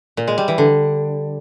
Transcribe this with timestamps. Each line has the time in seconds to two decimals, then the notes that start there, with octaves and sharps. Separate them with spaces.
0.17 A#2
0.28 G#3
0.38 G3
0.48 E3
0.58 D3